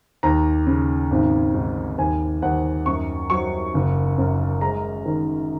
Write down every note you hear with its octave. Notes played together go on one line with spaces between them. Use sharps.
D#2 A#5
C#3
G#1
G#2
D#2 G#5
D#2 F#5
F#2 C#6
F#3 C#6
F#1
F#2
G#3 A#5
D#3